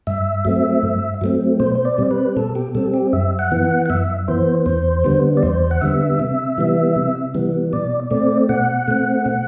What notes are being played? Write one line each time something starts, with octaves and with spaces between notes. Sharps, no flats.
G2 E5
F#3 A3 C4
G2
F#3 A3 C4
B2 C5
C5
D5
G3 C4
B4
B2 A4
G4
G3 C4 A4
G4
F#2 E5
F#5
E3 B3
F#5
F#5
F#2 E5
E3 B3 C5
E2 C5
D3 G3 B3
D5
E2 C5
F#5
D3 G3 B3 E5
C3
E3 G3 B3
C3
E3 G3 B3
B2 D5
A3 C4 D5
B2 F#5
A3 C4
B2